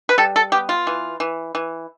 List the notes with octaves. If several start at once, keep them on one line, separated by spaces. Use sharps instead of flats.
B4
G3 A4
A4
B3 G4
F4
E3
E3
E3